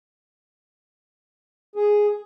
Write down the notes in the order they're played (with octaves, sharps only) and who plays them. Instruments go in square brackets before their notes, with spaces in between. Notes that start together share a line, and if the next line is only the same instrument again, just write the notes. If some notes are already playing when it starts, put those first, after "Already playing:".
[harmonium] G#4